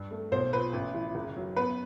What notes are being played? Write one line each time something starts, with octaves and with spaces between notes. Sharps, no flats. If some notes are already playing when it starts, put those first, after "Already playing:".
Already playing: G2
A3
B1 C5
A#2 B4
A1
E3
F#1
F#3
B3 B4